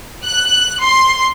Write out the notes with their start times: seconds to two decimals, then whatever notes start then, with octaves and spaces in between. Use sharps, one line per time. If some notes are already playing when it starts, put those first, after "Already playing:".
0.24 F#6
0.82 C6